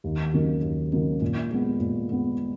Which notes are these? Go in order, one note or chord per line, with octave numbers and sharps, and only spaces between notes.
D#2
C#3 F#3 A#3 D#4
D#2
C#3 F#3 A#3 D#4
A#2
G#3 B3
A#2
G#3 B3